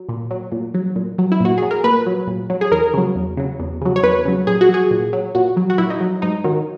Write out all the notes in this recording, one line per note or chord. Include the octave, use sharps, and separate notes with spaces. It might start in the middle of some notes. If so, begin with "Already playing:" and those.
Already playing: F#3
A#2
F#3
A#2
F#3
A#2
F#3
E4
A#2 F#4
F#3 G#4
A#4
A#2 B4
F#3
A#2
F#3
G#4
E2 A#4
C#3 F#3
E2
C#3 F#3
E2
C#3 F#3
C#5
E2 B4
C#3 F#3
A#2 G#4
F#4
F#3 G#4
A#2
F#3
A#2 F#4
F#3
F#4
A#2 E4
D#4
F#3
G#2 D#4
D#3 F#3